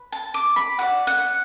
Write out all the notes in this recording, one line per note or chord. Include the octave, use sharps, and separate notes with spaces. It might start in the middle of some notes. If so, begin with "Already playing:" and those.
Already playing: B4
A5
D6
B5
F#4 D5 F#5
F#5